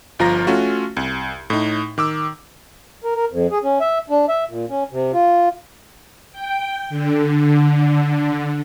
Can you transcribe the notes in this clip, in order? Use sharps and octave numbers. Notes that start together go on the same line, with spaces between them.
G1 F3 F4 F5 A#5 A#6
A3 C#4 F4 F#4
C2
A2 D#4
D#3 D6 E6
A#4
A#4
F2
G#4
C#4
E5
D4
E5
A#2
C#4
C3
F4
G5
D3